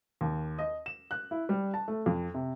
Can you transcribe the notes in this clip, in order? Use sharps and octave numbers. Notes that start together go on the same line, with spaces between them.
D#2
D#5
E7
F#6
E4
G3
A5
A3
F2
C3